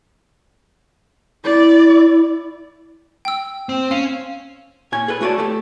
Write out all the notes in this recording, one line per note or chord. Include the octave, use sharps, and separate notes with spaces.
E4 D5
G5 E6
C4
C#4 F5
A#2 C#5 G#5
G#4 A4 B4
A3 F#4 C#5 D5 A5
A3 G4 A4